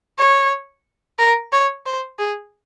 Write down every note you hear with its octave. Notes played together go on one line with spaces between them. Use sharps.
C#5
A#4
C#5
C5
G#4